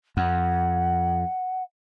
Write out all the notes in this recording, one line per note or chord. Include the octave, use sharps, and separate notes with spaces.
F2 F#5